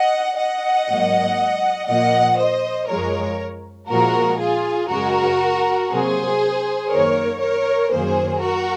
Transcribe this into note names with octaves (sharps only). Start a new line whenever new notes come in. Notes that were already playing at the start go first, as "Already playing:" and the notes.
Already playing: D#5 F#5
D#5 F#5
G#2 F#3 A#3
A#2 F3 A#3 D#5 F#5
C5 D#5
F#2 F3 G#3 A#4 C#5
A#2 F3 G#3 F#4 A#4
F4 G#4
F#2 C#3 G#3 F#4 A#4
C3 F#3 A#3 G#4 C5
F#2 D#3 A#3 A#4 C#5
A#4 C#5
F#2 D#3 F#3 A#3 G#4 C5
F#4 A#4